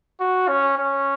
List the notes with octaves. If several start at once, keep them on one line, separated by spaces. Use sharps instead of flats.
F#4
C#4
C#4